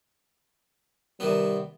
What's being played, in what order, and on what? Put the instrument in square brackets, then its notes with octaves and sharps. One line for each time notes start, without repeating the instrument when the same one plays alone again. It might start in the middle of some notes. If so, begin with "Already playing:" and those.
[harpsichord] C3 D#3 B3 [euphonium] G3